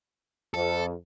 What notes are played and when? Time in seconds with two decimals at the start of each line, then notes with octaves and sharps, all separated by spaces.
0.54 F2 A4